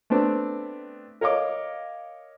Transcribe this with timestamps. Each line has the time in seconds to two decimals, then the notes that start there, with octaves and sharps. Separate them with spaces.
0.10 A3 B3 C4 D4
1.21 A#4 C#5 D#5 F5 D6